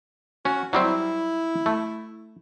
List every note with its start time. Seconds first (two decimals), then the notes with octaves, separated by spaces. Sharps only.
0.45 C#4 F#4
0.73 F#3 G3 C4 E4
1.66 A3